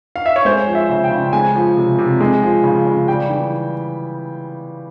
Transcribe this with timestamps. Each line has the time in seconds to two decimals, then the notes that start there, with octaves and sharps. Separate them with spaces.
0.16 F5
0.26 E5
0.36 C#5
0.45 G#3 C5
0.67 F3
0.75 E5
0.89 C#3
1.04 G5
1.11 C#3
1.33 G#3 G#5
1.55 F3
1.77 C3
1.99 C3
2.21 G#3
2.43 F3
2.64 C#3
2.86 C#3
3.08 G3 G5
3.29 E3